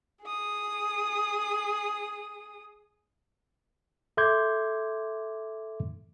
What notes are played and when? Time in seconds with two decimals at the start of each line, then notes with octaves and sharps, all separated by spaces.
0.24 G#4 D#6
4.17 A4 E5 C6 D6 G6 G#6